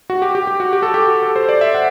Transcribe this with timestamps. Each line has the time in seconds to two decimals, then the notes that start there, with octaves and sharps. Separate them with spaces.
0.10 F#4
0.22 G4
0.35 G4
0.47 G4
0.60 F#4
0.73 G4
0.83 A4
0.94 G4
1.23 A4
1.36 C5
1.49 D5
1.61 E5
1.75 F#5